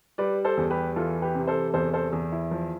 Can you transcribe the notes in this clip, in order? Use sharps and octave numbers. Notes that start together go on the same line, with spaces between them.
G3 B4 D5
A4 C5
E2
G4 B4
E3 F4 A4
G4 B4
C3
A4 C5
E2 A4 C5
A4 C5
E2
E4
F3